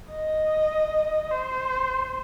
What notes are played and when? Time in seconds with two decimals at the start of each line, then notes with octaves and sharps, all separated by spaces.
0.12 D#5
1.31 C5